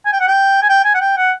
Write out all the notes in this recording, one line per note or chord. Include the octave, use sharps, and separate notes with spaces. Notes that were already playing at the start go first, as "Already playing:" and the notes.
G#5
G5
F#5
G5
G#5
G5
G#5
F#5
G5
F#5